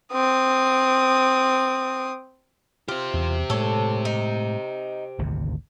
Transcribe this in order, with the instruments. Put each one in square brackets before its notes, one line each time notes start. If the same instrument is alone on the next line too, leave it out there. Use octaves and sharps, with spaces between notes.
[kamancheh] C4 D#6
[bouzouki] F4 [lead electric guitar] G4 C5
[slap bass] E2
[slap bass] A2 G#3 [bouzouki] A4 C#5
[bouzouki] D#4
[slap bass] G#1 D2 C3